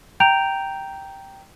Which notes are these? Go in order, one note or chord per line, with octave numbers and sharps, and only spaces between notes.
G5 A#5 G6 D7 F7